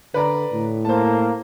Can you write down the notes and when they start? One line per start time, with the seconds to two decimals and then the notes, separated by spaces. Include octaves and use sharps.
0.14 D3 B4 D5 A#5
0.52 A2
0.85 A#3 C5 A5